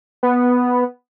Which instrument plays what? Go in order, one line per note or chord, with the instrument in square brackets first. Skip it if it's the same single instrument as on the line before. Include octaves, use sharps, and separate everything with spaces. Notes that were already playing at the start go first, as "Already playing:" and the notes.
[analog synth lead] B3